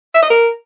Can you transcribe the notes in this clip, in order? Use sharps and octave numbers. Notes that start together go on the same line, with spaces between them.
E5
D#5
A#4